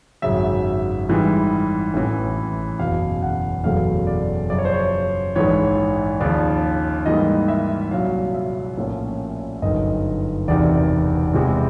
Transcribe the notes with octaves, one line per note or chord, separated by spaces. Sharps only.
G#1 F#2 C#3 F#3 E5
G#2 E3 G3
A1 A2 E3
F#1 E2 B2 F5
F#5
F#1 E2 B2 F#3 A3 F5
D5
F#2 C#3 F3 D5
C#5
C5
C#5
A#1 G#2 E3 C#5
D#2 C#3 F3 D5
G#2 E3 G3 A#3 D#5
E5
C2 A#2 F#3 F5
E5
A#1 A2 F3 A#3 C#4
G1 F#2 D#3 D#5
E1 E2 C3 D#3 D5
E2 C3 E3 G#3